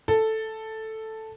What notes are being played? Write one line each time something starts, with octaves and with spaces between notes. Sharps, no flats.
A4